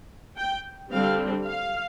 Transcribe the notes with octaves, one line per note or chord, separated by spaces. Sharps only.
G5
D3 G3 C4 F5
F5